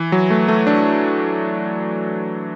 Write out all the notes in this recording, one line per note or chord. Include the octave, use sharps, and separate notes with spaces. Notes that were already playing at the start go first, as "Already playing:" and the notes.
Already playing: E3
F#3
A3
A3
D4